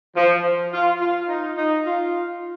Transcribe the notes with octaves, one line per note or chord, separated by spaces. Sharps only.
F3
F4
F4
D#4
D#4
F4